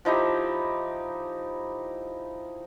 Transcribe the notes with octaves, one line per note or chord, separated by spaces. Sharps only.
F3 D#4 E4 G4